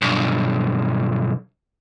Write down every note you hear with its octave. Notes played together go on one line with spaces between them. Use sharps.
B1 G2